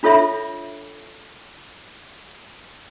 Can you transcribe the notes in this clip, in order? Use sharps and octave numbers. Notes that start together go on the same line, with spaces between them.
D4 F4 A4 C#5 E5 B5